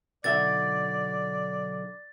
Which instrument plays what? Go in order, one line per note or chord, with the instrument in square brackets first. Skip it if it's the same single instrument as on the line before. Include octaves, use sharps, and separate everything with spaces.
[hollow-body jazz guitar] B1 D3 E5 [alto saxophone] D5 [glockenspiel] A6